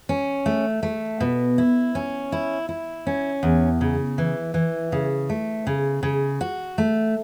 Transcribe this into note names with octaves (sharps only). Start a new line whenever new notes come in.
C#4
A3
A3
B2
E4
C#4
E4
E4
C#4
E2
C#3
E3
E3
C#3
A3
C#3
C#3
F#4
A3